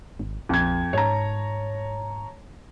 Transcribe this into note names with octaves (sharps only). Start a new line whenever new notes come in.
G#1
A#1 F2 G#6
G#2 C#5 A5 A#5